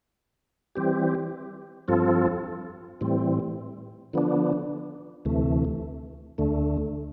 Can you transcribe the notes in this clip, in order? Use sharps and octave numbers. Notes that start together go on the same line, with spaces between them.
E3 G3 C4 G4
G2 F3 C4 F4 A4
A2 E3 G3 C4
D3 F3 B3 D4
D2 C3 E3 A3
D2 D3 A3